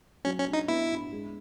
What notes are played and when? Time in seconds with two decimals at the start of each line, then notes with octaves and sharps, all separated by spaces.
0.25 F#3 C#4
0.39 C#4
0.47 D4
0.53 D#4
0.68 B3 E4
0.90 D4
1.11 G#3